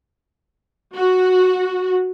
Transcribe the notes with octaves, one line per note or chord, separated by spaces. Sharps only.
F#4